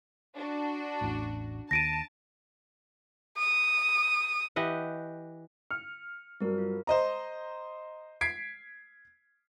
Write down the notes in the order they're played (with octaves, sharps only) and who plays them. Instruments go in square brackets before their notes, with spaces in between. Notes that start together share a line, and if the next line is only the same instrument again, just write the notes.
[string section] D4 F#4
[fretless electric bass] A1 E2 A2
[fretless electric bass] D#2 [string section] A5 [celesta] A#6 D7 D#7
[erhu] D#6
[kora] E3 G4 D#5 F#5
[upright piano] F6 [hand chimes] C#7
[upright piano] G2 F#3 [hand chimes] C4 A#4
[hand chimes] F4
[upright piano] C5 D#5 A#5
G#6 B6 C7 D7